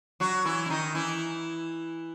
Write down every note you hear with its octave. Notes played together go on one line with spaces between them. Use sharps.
F#3 F#4
E3 E4
E4
D#3 D#4
E3 E4